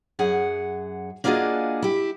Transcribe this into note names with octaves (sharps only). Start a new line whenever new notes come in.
F#2 G#4 F#5
A#3 D4 F4 F#4 G#4 D#5
E4 G4